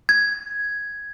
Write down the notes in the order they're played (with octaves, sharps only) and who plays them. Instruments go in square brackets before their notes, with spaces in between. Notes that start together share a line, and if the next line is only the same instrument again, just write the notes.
[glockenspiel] G#6